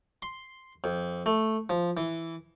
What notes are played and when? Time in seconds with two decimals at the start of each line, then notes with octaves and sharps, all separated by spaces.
0.22 C6
0.84 F2
1.26 A3
1.70 F3
1.97 E3